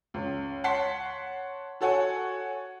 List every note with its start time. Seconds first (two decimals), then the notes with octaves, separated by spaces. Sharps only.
0.14 C#2
0.64 C#5 F#5 A5 C6 B6 C7
1.81 F#4 A4 C#5 F#5 G#5